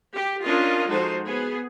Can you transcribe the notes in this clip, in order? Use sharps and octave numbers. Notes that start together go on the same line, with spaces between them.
G4
C#4 D4 F4 A#4 D#5
F3 G#3 D#4 F#4 A4 C5
B3 G#4